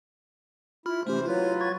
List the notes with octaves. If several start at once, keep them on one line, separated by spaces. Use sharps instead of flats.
E4 F4 B5 F6
C3 E3 A3 C#4 G4 C5
F#3 E4 F4 B4 C#5
C#6 G#6 A6